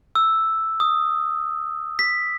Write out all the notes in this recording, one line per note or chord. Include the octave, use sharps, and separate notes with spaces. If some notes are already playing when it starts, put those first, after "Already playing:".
E6
D#6
B6